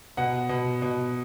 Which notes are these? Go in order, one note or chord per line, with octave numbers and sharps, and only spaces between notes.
B2 F#5
B2
B2